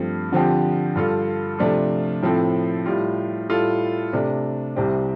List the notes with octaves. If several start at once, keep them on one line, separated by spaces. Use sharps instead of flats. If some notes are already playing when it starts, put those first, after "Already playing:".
Already playing: G2 F3 A3 C4
D3 F3 C4 G4
G2 G3 F4 A4
C3 F3 A3 D4 F4
A2 F3 C4 A4
A2 G3 F4
A2 G3 F4 A4
C3 A3 D4
C2 C3 G3 C4